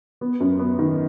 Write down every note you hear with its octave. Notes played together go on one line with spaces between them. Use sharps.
B3
F#2
B3
D#3